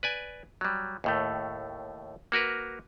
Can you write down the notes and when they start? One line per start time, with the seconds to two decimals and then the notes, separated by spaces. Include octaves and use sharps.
0.03 B4 D5 G#5
0.61 F#3 G3
1.04 D#2 A2 A3
2.32 A#3 F#4 A#4 B4